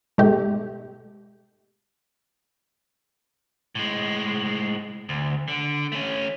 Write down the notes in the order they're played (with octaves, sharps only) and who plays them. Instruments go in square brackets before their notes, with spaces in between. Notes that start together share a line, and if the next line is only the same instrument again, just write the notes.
[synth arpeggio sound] G#2 B2 G#3 A3 G4
[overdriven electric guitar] A2 G#3
D2
D3
A3 C#4